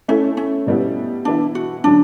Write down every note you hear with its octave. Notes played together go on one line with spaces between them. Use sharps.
A3 C#4 E4 A4
C#4
B2 G3 B3 E4
E3 B3 D4 E4
F#4
D3 F#3 C#4 D4